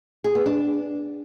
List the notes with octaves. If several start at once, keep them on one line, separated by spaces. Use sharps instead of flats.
G#4
B3
D4